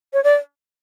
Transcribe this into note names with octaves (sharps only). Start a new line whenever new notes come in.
C#5
D5